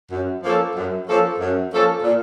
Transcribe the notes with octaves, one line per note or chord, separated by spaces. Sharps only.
F#2
F3 A#3 C#4 A4
F#2
F3 A#3 C#4 A4
F#2
F3 A#3 C#4 A4
A#2